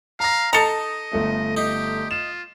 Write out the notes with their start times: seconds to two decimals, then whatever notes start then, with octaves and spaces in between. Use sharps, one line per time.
0.20 F5 A#5 A#6
0.53 D#4 A4 D#5 A5 A#5 C#7
1.12 G1 A3 E5
1.57 D#4 G4
2.11 F4 E7